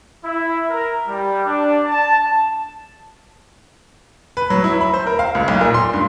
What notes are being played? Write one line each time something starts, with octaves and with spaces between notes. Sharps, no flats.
E4
A#4
G3
D4
A5
B4
F#3
E4
B5
C5
A#4
F5
C#2
B1
A#2
C6
G2